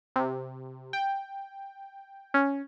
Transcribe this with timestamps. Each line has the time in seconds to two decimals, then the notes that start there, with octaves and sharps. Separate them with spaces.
0.16 C3
0.93 G5
2.34 C#4